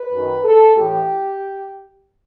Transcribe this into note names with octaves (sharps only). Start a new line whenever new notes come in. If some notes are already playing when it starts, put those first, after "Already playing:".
Already playing: B4
F#2 D#3
A4
A2 E3 G4